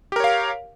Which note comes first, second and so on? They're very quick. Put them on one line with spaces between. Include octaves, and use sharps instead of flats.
G4 A#4 C#5 F5